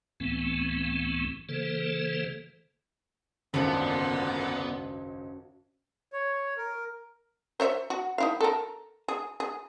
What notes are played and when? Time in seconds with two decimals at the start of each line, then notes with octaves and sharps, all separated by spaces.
0.20 C#2 A2 E3 A3 B3 C4
1.49 C#3 E3 A#3 A4 C5
3.54 G#1 C#2 F#2 A#2 D3 B3 D4 F#5
6.13 C#5
6.57 A#4
7.60 C5 C#5 E5
7.90 F#4
8.18 D#4 E4 F5
8.41 A4 A#4
9.08 G#4
9.40 G#4